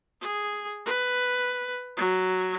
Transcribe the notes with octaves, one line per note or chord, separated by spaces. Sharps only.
G#4
B4
F#3